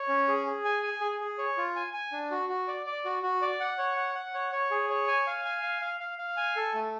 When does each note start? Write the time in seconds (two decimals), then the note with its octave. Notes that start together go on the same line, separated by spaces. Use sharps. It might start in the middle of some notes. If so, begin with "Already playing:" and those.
Already playing: C#5
0.08 C#4
0.28 G#4
0.47 G#4
0.65 G#5
0.83 G#5
1.01 G#4
1.20 G#4
1.38 C#5
1.57 F4
1.76 G#5
1.93 G#5
2.12 D4
2.31 F#4
2.49 F#4
2.68 D5
2.86 D5
3.05 F#4
3.23 F#4
3.42 D5
3.60 F#5
3.78 C#5
3.97 F#5
4.15 F#5
4.34 C#5
4.52 C#5
4.71 G#4
4.90 C#5
5.07 G#5
5.27 F5
5.45 G#5
5.63 F5
5.82 F5
6.00 F5
6.18 F5
6.37 G#5
6.56 A4
6.74 A3